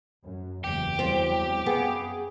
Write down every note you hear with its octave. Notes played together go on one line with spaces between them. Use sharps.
F#2
F#1 E2 G4
E2 F#3 G3 C4
F#2 B3 G#4